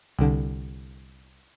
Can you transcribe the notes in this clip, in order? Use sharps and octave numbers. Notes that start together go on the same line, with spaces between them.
C2 D3